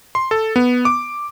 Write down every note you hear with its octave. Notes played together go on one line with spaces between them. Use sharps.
C6
A4
B3
D6